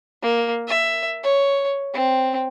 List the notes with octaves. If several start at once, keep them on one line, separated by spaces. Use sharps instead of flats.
A#3
E5
C#5
C4